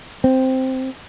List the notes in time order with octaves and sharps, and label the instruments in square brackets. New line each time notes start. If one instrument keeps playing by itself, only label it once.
[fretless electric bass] C4